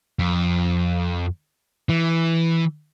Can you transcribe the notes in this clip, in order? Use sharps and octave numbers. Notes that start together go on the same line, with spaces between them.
F2
E3